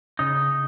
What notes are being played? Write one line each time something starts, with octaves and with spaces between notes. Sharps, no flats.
C#3 D#4